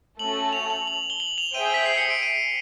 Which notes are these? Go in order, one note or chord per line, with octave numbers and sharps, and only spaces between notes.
A3 C#4 F#4 A4 F#7
F7
F#7
F#7
G7
F#7
F7
G#4 C5 E5 G5 D#7
B6
C7
C#7
D7
D#7